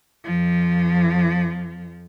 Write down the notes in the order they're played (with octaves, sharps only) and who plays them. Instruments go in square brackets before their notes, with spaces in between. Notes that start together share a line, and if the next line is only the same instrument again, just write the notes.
[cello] F2 F3